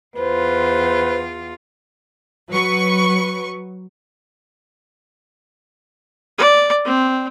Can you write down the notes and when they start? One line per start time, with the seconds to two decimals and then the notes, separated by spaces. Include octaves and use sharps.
0.16 E2 F4 B4 C5
2.50 F#3 B4 C#6
6.38 D5
6.85 C4